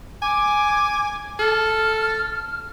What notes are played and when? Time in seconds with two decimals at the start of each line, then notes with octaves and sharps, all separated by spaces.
0.22 G#5 D6
1.39 A4 F6